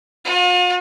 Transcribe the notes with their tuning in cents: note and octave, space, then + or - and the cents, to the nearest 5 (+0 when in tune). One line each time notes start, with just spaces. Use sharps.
F4 +45